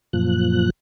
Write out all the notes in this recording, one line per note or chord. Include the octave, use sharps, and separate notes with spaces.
F#2 A#2 F3 F#6